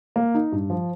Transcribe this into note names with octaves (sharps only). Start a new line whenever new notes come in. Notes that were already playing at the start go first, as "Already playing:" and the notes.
A#3
D#4
G2
F3